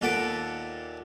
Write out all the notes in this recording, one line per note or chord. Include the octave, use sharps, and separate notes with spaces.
D#2 A#2 A4 F#5 B5 D6